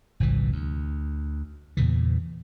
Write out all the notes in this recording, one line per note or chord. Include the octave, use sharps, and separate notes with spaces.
G1 C2 A#2 E3
D2
E2 A#2 C#3 E3